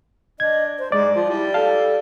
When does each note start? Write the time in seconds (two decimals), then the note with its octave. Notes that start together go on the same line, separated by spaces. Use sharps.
0.40 D4 D#5 G#6
0.79 C5
0.92 G#2 G#3 D5
1.15 F3 F4
1.30 G3 E4
1.54 A4 F5 A5